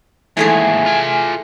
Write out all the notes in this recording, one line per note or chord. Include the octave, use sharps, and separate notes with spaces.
D#2 G#2 E3 A3 G#4
F4 G#5